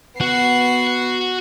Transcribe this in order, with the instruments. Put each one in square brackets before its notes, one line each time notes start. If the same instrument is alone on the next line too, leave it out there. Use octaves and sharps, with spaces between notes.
[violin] B3 C7 [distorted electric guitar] F#4 F#5